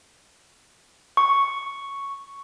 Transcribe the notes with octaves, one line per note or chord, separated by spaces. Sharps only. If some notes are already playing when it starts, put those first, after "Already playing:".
C#6